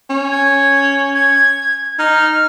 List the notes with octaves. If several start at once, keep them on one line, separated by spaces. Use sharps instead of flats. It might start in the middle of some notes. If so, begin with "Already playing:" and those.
C#4
G#6
G#6
D#4 F6